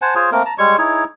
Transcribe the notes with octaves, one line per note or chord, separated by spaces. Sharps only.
C5 F#5 G#5 A5
F4 G#4 C5 C#5
A3 A#3 C4 A#4
A5 A#5
G3 G#3 C#5 C#6
D#4 E4 G#4 C#5